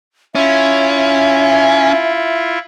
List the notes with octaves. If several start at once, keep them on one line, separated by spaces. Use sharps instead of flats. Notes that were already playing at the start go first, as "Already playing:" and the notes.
C#4 E4 F4 E5